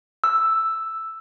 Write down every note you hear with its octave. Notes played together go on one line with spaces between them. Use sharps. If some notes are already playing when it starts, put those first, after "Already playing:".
E6